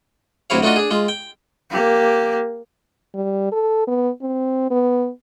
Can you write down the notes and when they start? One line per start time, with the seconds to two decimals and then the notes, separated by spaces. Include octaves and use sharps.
0.50 D2 C3 F#3 E4 C#5 F5
0.63 A3 D4 D#4 F4 F#4 D#5
0.76 D4 G#4
0.91 G#3 F4
1.08 G5
1.70 A#3 G4
3.15 G3
3.52 A4
3.87 B3
4.22 C4
4.71 B3